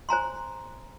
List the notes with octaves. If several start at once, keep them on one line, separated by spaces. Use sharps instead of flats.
C5 G#5 A#5 C6